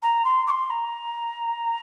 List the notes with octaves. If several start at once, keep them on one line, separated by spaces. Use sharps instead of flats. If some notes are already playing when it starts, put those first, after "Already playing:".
A#5
C6
D6
C6
A#5